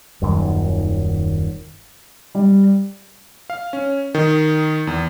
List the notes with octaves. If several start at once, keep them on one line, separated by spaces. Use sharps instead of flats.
D#1 F#2 D#3
G3
F5
C#4
D#3
E2